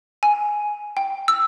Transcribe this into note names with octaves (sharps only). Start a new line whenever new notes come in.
G#5
G5
E6